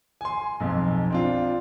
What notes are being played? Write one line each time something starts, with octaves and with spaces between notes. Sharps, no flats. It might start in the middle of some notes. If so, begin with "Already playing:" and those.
G#5 C6
B1 F2
C4 D4 F4